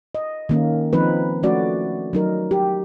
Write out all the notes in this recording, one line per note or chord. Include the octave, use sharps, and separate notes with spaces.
D#5
D#3 A#3 C#4
D#3 F3 C4 D#4 B4
F3 A3 C#4 F#4 D5
F#3 D#4 A#4
G4